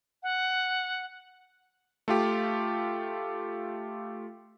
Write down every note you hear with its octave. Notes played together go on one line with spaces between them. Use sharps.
F#5
A3 F4 G4